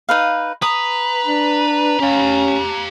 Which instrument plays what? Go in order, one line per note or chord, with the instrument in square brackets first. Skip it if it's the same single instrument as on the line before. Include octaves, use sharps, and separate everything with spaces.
[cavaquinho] D#4 B4 F5
[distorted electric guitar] B4 [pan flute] A#5 [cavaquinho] D#6
[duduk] D4
[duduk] C#4 [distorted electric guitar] G4 F5